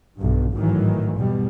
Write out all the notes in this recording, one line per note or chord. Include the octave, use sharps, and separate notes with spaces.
B1 G2
G#1 A2 D#3 E3 F#3
E2 B2 G3